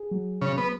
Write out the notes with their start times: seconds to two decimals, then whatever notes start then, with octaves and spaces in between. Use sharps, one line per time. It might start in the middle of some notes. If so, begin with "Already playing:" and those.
Already playing: G#4
0.11 F#3
0.42 C#3 F#3
0.58 B3